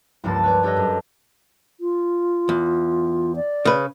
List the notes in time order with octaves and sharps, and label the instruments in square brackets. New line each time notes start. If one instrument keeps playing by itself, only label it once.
[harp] C#2 G2 F3 A#3 A5 A6
B4 C#5 D5
D4 G4 A4 C#5 D#5
F#2
[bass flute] F4
[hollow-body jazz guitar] E2
[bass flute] D5
[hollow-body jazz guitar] C#3 B4